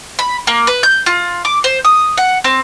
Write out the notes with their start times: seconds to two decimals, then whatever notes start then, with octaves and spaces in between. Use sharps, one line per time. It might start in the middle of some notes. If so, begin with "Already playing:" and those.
0.19 B5
0.47 A#3
0.67 B4
0.83 G6
1.06 F4
1.45 D6
1.64 C5
1.85 D#6
2.17 F#5
2.44 C4